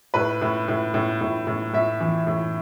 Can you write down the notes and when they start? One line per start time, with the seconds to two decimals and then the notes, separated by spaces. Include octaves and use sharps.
0.14 A2 B4
0.41 A2
0.68 A2
0.94 A2
1.21 A2
1.47 A2
1.73 A2 E5
2.00 E3
2.27 A2